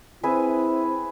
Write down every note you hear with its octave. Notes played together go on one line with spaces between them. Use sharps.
C4 E4 G#4 B4 E5